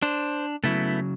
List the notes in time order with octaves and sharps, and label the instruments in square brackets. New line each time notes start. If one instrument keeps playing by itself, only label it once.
[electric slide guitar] D4 [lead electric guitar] C5
[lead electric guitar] C#3 F#3 [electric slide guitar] A3 B3 E4